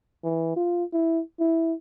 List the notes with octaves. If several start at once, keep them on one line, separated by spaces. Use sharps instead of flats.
E3
F4
E4
E4